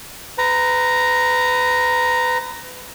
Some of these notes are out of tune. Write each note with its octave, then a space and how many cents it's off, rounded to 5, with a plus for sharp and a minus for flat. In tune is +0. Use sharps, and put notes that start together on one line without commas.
B4 +30 A#5 +0